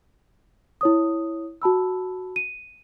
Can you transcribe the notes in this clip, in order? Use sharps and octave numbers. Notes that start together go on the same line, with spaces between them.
E4 C#5 D#6
F#4 A5 B5 E6
D#7